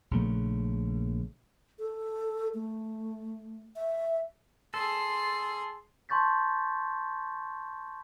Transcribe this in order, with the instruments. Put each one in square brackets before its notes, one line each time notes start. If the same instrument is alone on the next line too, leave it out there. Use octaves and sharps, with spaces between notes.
[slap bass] A#1 C#3 A3
[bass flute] A4
A3
E5
[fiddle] G#4 C6 [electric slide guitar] A4
[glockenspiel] A5 C6 C#6 G6 A6 B6